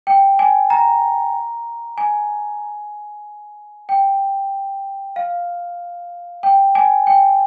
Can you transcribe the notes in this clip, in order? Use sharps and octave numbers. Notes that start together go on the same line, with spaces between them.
G5
G#5
A#5
G#5
G5
F5
G5
G#5
G5